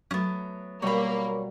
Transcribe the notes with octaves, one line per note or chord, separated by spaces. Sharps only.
F#3 A3 B3 C#4
B2 G3 A#3 C#5 B5